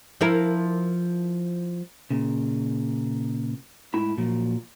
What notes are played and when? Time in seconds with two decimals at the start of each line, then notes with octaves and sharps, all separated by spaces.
0.21 F3 E4 A#4
2.11 A#2 C#3
3.94 A2 G#3 E4 B5
4.18 A#2 F3 F#3